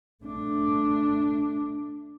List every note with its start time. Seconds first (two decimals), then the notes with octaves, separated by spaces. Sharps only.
0.24 A3 D4